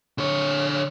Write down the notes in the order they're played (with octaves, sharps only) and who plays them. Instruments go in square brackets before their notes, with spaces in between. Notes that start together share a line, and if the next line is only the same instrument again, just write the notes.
[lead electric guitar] D3 C#5